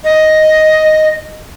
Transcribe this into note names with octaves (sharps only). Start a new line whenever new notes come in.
D#5